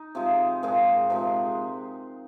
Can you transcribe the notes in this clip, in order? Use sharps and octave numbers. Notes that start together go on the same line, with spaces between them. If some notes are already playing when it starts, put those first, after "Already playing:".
Already playing: D#4
C3 F3 G#3
A#2 F3 G#3 F4
C3 F3 G#3